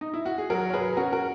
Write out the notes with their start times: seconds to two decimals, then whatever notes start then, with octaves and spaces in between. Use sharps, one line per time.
0.01 D#4
0.14 E4
0.25 F#4
0.38 G#4
0.50 F#3 F#4 A#4
0.69 C#5
0.73 F#3 G#4 B4
0.97 C#4 F#4 A#4
1.12 F#4 A#4